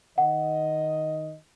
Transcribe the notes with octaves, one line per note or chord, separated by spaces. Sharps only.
D#3 D#5 F#5